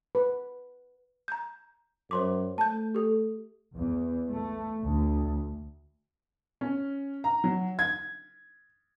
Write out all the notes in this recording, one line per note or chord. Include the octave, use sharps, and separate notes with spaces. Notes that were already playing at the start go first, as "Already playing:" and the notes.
B4
A#5 G6
F#2 C5 C6 D6
A3 A5 G6
G4 A4
E2
A3
D2
C#4
A#5
F#3
G#6